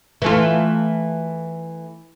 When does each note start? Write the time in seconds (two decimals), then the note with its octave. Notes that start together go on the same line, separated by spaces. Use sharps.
0.22 E3 A3 F4